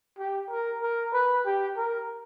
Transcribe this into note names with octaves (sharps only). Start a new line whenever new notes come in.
G4
A#4
A#4
B4
G4
A#4